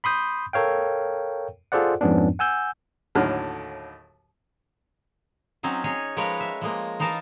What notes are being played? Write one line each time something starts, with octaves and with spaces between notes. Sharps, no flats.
B5 C6 D#6 G6
A4 A#4 C#5 F5 G5
F4 G#4 A4 C5 D5 F#5
F2 G#2 F3 B3 C#4 D4
F#5 G#5 E6 G6
D#2 A2 D3 F#3 F6
F#3 C4 C#4 D#4
D#4 G#4 C#5
F3 G#3 A#4 B4 C#5
E5
F3 G#3 A#3
E3 D#4 A#4 F5 A5